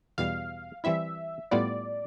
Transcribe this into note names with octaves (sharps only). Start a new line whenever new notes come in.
E2 B2 G3 F5
E3 G3 C4 E4 E5
A2 G3 B3 F4 B4 D5